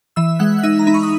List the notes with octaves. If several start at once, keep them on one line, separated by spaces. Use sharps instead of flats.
E3 E5 E6
G#3 F#5 F#6
F#6
D#4 E5 E6
A#5
D#4 B5
C#6
D#6